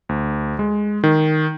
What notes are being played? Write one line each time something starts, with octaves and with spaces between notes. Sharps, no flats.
D2
G#3
D#3